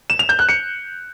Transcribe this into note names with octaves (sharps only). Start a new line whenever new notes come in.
E7
F7
G6
F#6
C#7